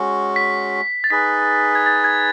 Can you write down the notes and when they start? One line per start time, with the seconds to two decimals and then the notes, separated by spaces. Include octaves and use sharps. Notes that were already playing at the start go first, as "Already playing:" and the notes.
Already playing: G#3 C#4 F#4
0.36 B6
1.04 A6
1.10 D#4 G#4 B4 B6
1.75 G#6
1.86 A6
2.04 G#6